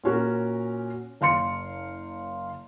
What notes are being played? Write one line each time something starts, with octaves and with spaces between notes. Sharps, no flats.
A#2 C#4 F#4 A#4
F#1 F5 C6 C#7